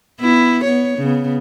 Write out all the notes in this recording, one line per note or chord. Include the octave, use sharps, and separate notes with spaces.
B3 E4
B3 C#5
C#3 B3